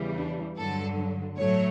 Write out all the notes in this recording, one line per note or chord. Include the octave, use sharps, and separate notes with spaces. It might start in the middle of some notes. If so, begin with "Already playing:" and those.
Already playing: E2 C#3 E3 G3
D4
G2 D3 F#3 A4
A2 F#3 A3 C#5